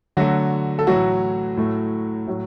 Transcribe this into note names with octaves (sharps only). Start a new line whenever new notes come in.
D3 F#3 A3 F#4
A4
A2 E3 F#3 A3 F#4
A2 A3
A2 F#3